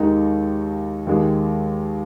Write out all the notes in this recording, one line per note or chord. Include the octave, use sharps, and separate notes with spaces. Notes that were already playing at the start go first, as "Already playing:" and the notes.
Already playing: D#2 D#3 G#3 D#4
D#2 D#3 G#3